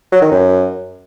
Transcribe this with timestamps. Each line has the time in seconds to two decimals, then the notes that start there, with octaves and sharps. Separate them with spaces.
0.12 F#3
0.22 D#3
0.31 F#2